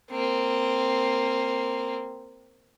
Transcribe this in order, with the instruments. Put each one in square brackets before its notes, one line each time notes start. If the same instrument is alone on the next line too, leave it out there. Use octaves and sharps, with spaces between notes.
[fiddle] A#3 C4